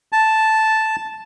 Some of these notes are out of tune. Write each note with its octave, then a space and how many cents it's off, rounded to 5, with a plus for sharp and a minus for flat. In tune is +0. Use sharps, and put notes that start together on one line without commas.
A5 -5